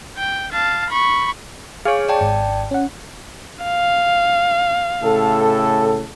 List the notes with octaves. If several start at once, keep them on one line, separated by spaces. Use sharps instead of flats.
G5
F5 A5
B5 C#6
G#4 C#5 F5 G#5 C#6
D5 G5 A5
G#1
C#4 F#5
F5
A2 C#3 A4